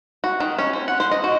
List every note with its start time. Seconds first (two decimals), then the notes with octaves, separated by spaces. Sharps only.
0.24 F#4
0.40 D#3
0.58 C#4
0.73 C4
0.88 F#5
1.00 C5
1.11 D#5
1.24 F#4